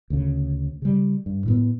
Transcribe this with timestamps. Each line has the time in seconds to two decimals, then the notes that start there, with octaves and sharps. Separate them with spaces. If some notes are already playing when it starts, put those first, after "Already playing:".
0.10 D2 C#3
0.82 C#3 G3
1.26 G2
1.46 A2 F#3 B3